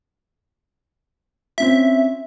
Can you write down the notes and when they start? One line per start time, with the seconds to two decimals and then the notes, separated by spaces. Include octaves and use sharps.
1.58 C4 C#4 F4 E5